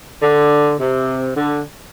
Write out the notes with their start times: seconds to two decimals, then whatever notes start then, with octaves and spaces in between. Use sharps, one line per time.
0.22 D3
0.79 C3
1.36 D3